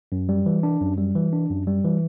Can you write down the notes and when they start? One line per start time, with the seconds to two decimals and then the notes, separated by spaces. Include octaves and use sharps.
0.12 F#2
0.29 G3
0.46 E3
0.63 D4
0.81 F#2
0.98 G3
1.15 E3
1.33 D4
1.50 F#2
1.67 G3
1.84 E3